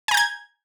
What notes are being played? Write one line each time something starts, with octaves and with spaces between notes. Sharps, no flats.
G#5 A#5 G6 G#6